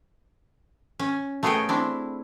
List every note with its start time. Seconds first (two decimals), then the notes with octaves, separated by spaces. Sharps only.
0.99 C#4
1.43 A3 B3 G#4 A#4 C#5 G5
1.69 C4 D4 E4